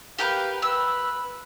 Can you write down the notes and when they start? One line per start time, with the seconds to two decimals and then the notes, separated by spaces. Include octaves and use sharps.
0.19 G4 A#4 B4 F5
0.62 B4 E6